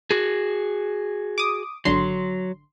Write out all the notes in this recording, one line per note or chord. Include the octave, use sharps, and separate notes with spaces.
F#4 G#4
D6 D#6
G#1 D3 F#3 C6